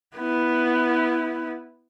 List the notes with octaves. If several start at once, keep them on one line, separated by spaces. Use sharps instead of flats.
B3 E4